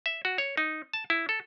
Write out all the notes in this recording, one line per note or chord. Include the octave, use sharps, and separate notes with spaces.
E5
F#4
C#5
D#4
A5
E4
A4